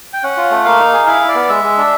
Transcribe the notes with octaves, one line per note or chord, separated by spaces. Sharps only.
G5
C#4 F#5
F4
A3
A#3 F5
D#4
G#4
E4 F5
E4
D5
B3
G#3 E5
G#3
D4